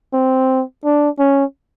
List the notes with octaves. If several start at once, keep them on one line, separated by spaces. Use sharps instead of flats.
C4
D4
C#4